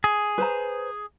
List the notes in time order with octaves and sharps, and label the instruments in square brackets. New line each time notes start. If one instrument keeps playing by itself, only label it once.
[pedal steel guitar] G#4
[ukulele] B4 C5 A#5